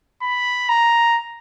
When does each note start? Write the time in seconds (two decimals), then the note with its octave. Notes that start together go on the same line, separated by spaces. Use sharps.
0.22 B5
0.69 A#5